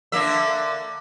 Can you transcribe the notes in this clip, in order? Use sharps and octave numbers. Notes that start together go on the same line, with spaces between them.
D3 A#3 E5